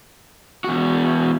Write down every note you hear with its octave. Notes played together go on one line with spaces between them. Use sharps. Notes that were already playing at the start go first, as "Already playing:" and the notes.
E2 F#4